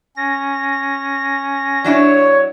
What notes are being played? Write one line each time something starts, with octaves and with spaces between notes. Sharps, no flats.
C#4 A#6
F#3 D4 E4 C#5